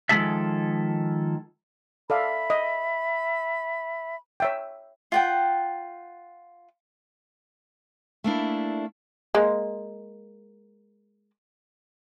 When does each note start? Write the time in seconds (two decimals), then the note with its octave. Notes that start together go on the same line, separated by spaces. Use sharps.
0.09 D#3 F3 G#3 G#4 A4 E5
2.10 A4 D5 E5 F5 B5
2.50 D#5
4.40 C#5 E5 G5
5.12 F4 F#5 G5
8.24 A3 A#3 D4 E4
9.35 G#3 A#3